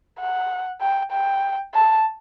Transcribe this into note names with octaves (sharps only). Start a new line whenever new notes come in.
F#5
G5
G5
A5